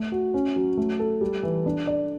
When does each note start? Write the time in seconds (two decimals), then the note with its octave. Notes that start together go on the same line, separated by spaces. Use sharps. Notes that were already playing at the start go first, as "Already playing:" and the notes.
Already playing: A3
0.12 F#4
0.34 C#4
0.56 F#3
0.77 A3
0.99 A4
1.21 G3
1.43 E3
1.66 D4
1.87 D5